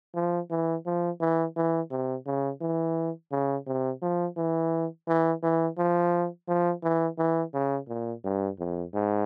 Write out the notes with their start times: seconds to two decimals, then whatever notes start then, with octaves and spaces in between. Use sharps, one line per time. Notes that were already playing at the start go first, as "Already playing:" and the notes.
0.15 F3
0.51 E3
0.86 F3
1.21 E3
1.56 E3
1.91 C3
2.26 C#3
2.61 E3
3.32 C#3
3.67 C3
4.02 F3
4.37 E3
5.08 E3
5.43 E3
5.78 F3
6.48 F3
6.83 E3
7.18 E3
7.54 C#3
7.88 A#2
8.24 G2
8.59 F2
8.94 G#2